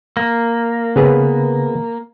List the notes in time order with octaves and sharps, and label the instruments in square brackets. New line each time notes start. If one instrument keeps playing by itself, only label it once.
[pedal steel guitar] A#3
[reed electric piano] C#3 [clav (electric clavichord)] B3 G#4 B4